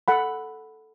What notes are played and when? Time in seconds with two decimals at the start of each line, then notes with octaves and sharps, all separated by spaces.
0.08 A4 F#5 B5